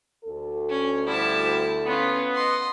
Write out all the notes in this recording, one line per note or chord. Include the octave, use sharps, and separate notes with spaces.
D2 A4
C#4
D3 F3 G3 E4 A5
B3 C#4 F4
D#5 C6